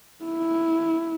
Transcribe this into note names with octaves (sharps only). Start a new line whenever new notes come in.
E4